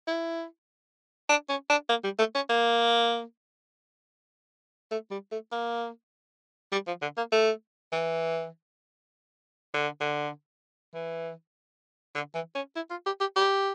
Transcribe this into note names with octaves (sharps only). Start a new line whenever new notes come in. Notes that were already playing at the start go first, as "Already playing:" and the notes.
E4
D4
C#4
D4
A#3
G3
A3
C#4
A#3
A3
G3
A3
A#3
G3
F3
D3
A#3
A3
E3
D3
D3
E3
D3
E3
C#4
E4
F4
G4
G4
G4